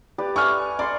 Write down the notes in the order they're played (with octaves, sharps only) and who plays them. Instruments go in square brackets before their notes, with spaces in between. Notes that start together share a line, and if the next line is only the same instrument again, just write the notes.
[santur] G4 B4 D5
[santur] E5 G#5 [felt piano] C#6 F6
[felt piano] D5 [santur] A#5 C6 C#6